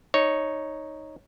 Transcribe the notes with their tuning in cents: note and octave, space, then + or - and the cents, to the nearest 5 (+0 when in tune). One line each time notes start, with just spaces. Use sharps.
D#4 +0 C#5 +0